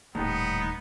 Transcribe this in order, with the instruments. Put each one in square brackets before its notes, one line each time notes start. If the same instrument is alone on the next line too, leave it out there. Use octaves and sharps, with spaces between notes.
[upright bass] D#1 [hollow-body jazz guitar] A2 D#3 G3 [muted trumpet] B3 [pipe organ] D#4